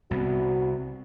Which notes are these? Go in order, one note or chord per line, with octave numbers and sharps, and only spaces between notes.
C2 C3 B3 F#4